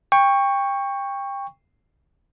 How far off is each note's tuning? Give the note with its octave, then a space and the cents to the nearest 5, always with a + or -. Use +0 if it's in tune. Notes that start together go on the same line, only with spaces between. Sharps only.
G5 +25 C#6 +0